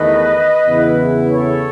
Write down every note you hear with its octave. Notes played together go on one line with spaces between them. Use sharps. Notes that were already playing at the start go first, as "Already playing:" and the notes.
Already playing: E2 D#3 A3 B4 D#5
E2 C#3 E3 B3 E4
A4 C#5